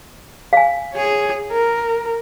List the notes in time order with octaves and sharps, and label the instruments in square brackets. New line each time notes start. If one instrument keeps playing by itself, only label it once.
[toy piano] F5 G#5
[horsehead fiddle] G#4 C#5
A#4